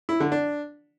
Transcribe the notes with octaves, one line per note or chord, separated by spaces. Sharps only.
E4
D3
D4